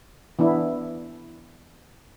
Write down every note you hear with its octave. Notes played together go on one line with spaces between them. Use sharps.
E3 B3 D4 E4